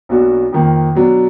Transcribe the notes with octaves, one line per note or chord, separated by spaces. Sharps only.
B1 B2 A#3 D4 F#4
F2 D#3 A#3
B2 F#3 D4